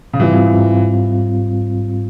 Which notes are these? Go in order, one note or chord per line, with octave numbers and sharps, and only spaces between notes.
C#3
G#2 E3 G3 C4 F4